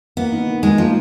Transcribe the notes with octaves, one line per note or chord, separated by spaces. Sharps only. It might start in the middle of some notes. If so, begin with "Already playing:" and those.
A#3 B3
D#4
D#3
D#3 G#3
F3 A#3